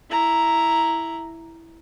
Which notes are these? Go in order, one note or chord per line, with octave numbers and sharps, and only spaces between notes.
E4 A#5